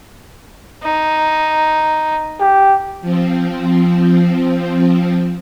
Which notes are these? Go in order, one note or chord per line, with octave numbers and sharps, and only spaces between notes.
D#4
G4
F3 C4